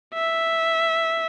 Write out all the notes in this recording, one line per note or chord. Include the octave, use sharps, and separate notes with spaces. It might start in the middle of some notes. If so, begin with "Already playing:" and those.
E5